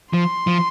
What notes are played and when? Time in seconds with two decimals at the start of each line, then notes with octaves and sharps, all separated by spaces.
0.13 F3 C6
0.47 F3